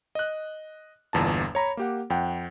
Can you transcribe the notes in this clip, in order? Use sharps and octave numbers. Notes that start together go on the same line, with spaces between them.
D#5 F#6
G1 E2 A#2 A5
C#5 A#5 B5
A#3 G4 F#5
F2 F#5 G5